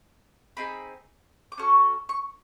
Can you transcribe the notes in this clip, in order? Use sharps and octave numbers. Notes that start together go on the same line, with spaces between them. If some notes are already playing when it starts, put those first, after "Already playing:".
C4 D#4 G#4 B5
D6
C#4 F#4 A4 C#6
C#6